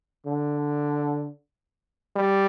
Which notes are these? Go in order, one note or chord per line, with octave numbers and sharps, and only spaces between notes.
D3
G3